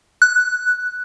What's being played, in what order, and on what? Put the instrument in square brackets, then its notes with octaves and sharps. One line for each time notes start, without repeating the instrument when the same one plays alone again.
[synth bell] F#6